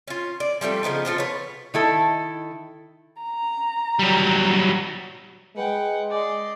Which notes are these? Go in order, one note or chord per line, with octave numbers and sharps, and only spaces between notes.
C#4 F4
D5
F3 G3 A3 C4
C#3 F3 B3 D#4
B2 F3 F4 A4
B4 C#5
D#3 E4 A4
A#5
F#3 G3
G#3 B4 F#5 G5
D5 D#5 C6